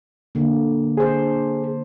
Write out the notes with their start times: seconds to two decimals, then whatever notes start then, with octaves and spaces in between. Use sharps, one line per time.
0.35 D3 A#3
0.97 D4 G#4 C5